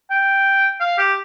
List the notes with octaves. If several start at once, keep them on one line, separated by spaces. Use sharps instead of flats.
G5
F5
G4